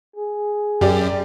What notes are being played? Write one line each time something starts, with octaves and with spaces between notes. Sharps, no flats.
G#4
F#2 G4 D5